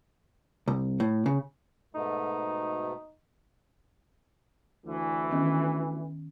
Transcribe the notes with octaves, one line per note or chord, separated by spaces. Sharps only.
C2
A2
C#3
G#2 B2 A3 D#4
D2 E3
D#3 B3 C#4